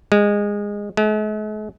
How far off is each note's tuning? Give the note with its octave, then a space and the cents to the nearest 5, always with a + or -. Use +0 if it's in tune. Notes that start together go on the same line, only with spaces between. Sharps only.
G#3 -20
G#3 +45